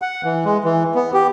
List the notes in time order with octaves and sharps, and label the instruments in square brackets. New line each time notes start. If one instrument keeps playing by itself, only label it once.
[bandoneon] F#5
E3
G#3
E3
B3
G4